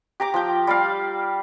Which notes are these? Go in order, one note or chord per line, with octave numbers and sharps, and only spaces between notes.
G4 A#5 D6
F3 G5
G3 D5 F5